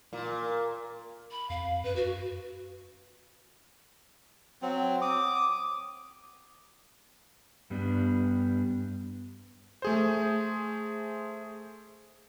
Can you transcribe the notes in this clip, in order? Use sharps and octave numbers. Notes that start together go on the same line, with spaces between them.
A#2
B5
F2 F5
F#2 B4
F#4
F#3 C4
D6 D#6
G2 G3 B3 D4
A3 G#4 C5